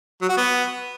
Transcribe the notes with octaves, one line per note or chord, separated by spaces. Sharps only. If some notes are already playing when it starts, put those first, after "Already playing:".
F#3
F#4
B3